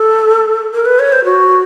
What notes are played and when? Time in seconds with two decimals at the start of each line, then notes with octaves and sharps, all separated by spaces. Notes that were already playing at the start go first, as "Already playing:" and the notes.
Already playing: A4
0.74 A#4
0.85 B4
0.99 C#5
1.12 C5
1.25 F#4